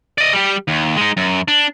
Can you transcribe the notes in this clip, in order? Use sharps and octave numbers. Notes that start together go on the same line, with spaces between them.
D5 D#5
G3 G4
D#2
G#3 D#4
F#2
D4